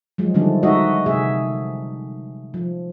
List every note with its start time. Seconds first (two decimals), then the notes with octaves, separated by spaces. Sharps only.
0.18 F3 F#3 G#3
0.34 D3 D#3 F3 G3 A3 D4
0.63 G#3 D#4 F#4 D#5 E5
1.06 C3 A3 G#4 E5
2.54 F3